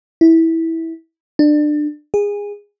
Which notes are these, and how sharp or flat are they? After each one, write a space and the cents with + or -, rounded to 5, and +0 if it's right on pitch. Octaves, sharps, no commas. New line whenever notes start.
E4 -15
D4 +25
G#4 -20